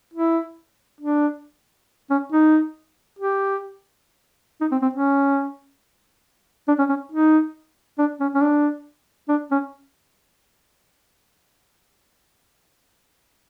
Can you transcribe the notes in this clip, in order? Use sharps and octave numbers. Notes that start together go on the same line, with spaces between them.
E4
D4
C#4
D#4
G4
D#4
C4
C4
C#4
D4
C#4
C#4
D#4
D4
C#4
C#4
D4
D4
C#4